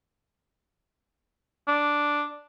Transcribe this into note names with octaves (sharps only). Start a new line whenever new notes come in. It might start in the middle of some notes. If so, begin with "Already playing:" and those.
D4